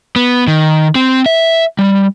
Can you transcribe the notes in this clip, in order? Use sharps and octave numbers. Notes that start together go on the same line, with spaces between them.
B3
D#3
C4
E5
G3